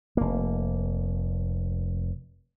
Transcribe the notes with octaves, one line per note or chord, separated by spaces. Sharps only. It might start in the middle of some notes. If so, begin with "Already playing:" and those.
F1 A#3